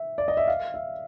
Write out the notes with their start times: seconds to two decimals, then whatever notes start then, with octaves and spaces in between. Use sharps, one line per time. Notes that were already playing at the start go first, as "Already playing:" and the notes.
Already playing: E5
0.18 D5
0.28 D#5
0.37 E5
0.48 F5
0.74 E5